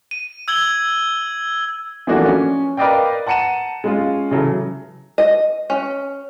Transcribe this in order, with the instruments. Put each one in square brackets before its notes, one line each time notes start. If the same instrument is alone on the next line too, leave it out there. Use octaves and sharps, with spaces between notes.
[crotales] D#7
E6 G#6 F#7 G7
[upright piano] E3 F3 A3 A#3 D4 F#4
C#4
A#4 B4 D5 D#5 F5 G5
F#5 A5 A#5 C#7 D#7 E7
G#3 C#4 F4
C#3 E3 F#3 A4
[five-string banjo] D#5
C#4